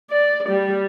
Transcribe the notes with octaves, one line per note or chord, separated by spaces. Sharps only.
D5
G3